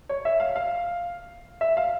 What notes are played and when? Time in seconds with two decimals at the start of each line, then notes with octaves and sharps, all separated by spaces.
0.09 C#5
0.25 E5
0.40 F5
0.56 F5
1.61 E5
1.77 F5